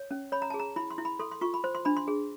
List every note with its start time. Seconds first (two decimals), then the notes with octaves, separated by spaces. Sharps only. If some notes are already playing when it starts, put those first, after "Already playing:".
Already playing: C#5
0.11 C#4
0.32 C#5 B5
0.42 A#5
0.50 G#4 A5
0.59 A#5
0.76 E4 B5
0.90 C6
0.98 E4
1.05 B5
1.19 A4 C6
1.32 C6
1.41 F4 C#6
1.54 B5
1.64 C5 C6
1.75 C6
1.85 D4 B5
1.97 C6
2.08 G#4